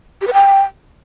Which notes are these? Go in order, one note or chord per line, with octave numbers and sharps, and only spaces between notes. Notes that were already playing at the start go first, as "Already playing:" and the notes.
G4
B4
G5